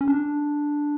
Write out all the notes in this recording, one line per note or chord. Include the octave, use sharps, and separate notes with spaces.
C#4
D4